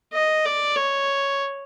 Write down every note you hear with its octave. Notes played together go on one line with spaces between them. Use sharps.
D#5
D5
C#5